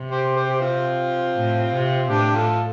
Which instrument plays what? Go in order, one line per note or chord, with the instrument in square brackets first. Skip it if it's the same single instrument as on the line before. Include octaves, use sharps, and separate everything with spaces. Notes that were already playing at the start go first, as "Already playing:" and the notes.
Already playing: [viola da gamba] C3
[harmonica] G4 C5
G4 C5
G4
C4 F4
[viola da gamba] A2
C3
[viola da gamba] A2 [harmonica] D4 G4
[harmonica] F4 A4